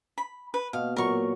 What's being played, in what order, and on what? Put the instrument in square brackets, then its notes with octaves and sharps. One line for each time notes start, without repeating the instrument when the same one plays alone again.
[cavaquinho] B5
B4
[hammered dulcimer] B2 [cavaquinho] F5
[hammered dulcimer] A#2 F#3 A#3 [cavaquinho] A#4 C#6